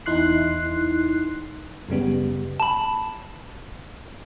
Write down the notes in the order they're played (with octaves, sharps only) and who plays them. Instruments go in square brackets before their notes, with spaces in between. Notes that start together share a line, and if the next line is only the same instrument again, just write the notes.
[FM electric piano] E2 D#4 E4 C6 F#6 C7
F#2 C#3 G3 B3
[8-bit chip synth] A5 B5